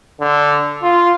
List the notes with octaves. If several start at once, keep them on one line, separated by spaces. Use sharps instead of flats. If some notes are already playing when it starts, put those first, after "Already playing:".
D3
F4